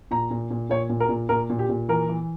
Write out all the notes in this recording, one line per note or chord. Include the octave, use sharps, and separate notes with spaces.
A#2 A#5
A#2
A#2
A#2 C#5
A#2
A#4
A#2
A#2 A#4
A#2
G4
A#2
E3 A#4
E3